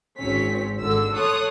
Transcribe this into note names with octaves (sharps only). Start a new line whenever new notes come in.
G#1 C4 C#4 B6
G#1 D3 E6
A4 C#5 A5 C6 D#6 F#6